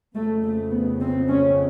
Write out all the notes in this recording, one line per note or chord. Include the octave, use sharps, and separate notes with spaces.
F2 C#3 A3
A3
B3
C4
C#4